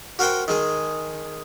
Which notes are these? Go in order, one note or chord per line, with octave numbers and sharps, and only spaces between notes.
F#4 A#4 C5 F#5 G5
D#3 G#3 G#4